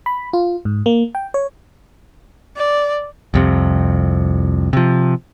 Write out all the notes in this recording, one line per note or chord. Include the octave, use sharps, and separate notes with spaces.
B5
F4
G#2
A#3
G5
C#5
D5
C2 F2 C3
C3 F3